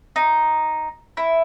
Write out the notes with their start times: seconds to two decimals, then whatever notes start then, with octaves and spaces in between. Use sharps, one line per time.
0.16 D#4
1.17 E4